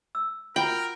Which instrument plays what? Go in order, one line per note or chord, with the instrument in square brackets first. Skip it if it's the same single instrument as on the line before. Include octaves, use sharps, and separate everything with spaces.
[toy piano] E6
[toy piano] F4 F#4 F#5 [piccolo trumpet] A#4 [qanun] G5